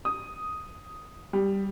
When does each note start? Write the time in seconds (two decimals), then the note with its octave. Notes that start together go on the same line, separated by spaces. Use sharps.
0.05 D#6
1.33 G3